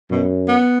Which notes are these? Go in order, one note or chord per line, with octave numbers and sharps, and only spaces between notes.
F#2 B2
B3